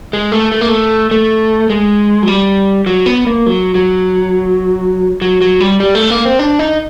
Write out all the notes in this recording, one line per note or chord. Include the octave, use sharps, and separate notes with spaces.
G#3
A3
A3
A#3
A3
A3
G#3
F#3
G3
F#3
B3
A#3
F#3
F#3
F#3
F#3
G3
G3
A3
A#3
C4
D4
D#4